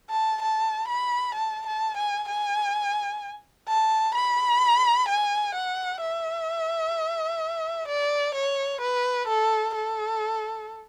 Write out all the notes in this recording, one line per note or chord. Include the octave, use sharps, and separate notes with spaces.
A5
A5
B5
A5
A5
G#5
G#5
A5
B5
G#5
F#5
E5
D5
C#5
B4
A4
A4